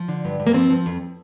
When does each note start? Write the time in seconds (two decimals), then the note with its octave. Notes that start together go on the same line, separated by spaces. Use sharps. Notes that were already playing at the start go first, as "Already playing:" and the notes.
Already playing: F3
0.08 D3
0.25 G2
0.40 G2
0.47 A#3
0.54 F3 C4
0.70 F3
0.86 F2